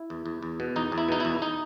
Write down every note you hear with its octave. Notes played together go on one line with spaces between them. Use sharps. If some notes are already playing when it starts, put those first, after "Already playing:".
Already playing: E4
E2
E2
E2
B2
E2 D#4
E2
E4
B2 D#4
E2 E4
D#4